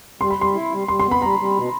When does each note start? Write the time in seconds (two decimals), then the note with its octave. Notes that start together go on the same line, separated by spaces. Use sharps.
0.21 G3 C6
0.30 B5
0.38 G3 C6
0.54 E4
0.71 G3
0.88 G3 C6
0.99 C6
1.06 B3
1.11 B5
1.22 G3 A#5
1.39 G3
1.56 B2